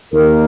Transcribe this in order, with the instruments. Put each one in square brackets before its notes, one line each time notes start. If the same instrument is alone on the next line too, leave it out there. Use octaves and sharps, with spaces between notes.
[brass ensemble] D#2 D#3 A#3 [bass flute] A#4